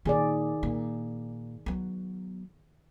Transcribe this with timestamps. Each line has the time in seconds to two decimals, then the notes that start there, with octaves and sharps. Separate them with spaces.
0.05 A#2 D#3 G#4 D5
0.63 A#2
1.66 F#3 B3